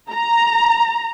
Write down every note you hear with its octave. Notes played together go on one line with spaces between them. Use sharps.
A#5